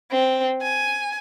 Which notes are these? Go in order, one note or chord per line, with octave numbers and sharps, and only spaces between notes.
C4
G#5